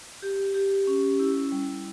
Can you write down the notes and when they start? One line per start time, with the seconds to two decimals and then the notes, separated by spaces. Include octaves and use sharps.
0.22 G4
0.54 G4
0.87 C#4
1.19 E4
1.52 G3